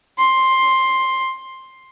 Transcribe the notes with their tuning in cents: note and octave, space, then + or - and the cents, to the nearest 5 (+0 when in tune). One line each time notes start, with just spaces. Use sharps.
C6 +5